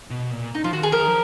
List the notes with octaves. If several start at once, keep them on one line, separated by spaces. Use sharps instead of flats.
B2
A#2
D#4
F3 F4
D#3 F#4
G#4
F3 A#4
D#3
F3